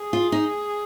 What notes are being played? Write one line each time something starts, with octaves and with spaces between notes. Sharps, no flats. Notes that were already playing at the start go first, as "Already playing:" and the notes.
Already playing: G#4
F4
D#4